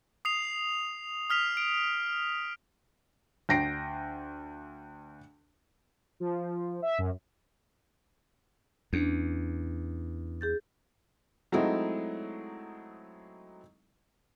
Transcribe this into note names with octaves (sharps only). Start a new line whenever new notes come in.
D#6 C7 F7
D#6 F6 B6 F7
D7
D2 G5 A#6 C7 D7
F3
E5
F#2
E2 C#4 D4
G#4 G6 A6
F#3 G#3 A3 C4 D#4 E4